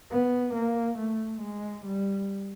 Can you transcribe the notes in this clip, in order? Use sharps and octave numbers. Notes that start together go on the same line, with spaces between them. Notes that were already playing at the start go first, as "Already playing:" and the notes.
B3
A#3
A3
G#3
G3